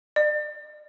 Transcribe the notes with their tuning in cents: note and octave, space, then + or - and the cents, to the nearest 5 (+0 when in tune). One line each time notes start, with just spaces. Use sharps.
D5 +35